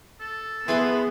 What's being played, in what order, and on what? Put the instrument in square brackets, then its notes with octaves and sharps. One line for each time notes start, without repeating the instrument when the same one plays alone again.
[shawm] A4
[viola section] B3 [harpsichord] E4 B4 C6 [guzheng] G#4